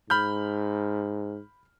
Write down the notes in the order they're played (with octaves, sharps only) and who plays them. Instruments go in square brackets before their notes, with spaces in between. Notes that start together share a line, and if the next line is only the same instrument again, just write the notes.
[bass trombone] G#2 [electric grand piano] B5 F6 G6